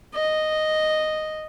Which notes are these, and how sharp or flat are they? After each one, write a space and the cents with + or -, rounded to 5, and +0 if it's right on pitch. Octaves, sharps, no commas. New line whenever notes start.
D#5 -5